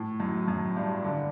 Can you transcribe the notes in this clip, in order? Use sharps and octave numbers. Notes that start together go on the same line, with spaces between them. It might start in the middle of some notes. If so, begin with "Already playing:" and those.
Already playing: A2
F#2
F#2
G2
D3